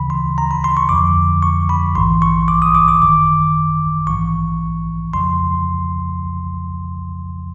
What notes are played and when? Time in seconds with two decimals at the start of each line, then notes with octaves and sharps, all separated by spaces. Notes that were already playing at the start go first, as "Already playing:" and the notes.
Already playing: D2 C#3 E3 B5
0.10 C6
0.38 A#5
0.51 B5
0.64 C6
0.77 C#6
0.89 F2 D3 F3 D6
1.43 C#6
1.69 B5
1.95 A#1 G#2 E3 C6
2.22 C#6
2.48 D6
2.62 D#6
2.75 D6
2.88 D6
3.01 G#1 F#2 D#3 D6
4.07 A#1 G#2 E3 C#6
5.14 F2 C#3 F3 C6